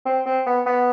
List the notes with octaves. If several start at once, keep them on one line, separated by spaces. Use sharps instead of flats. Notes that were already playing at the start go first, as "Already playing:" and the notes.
C4
C4
B3
B3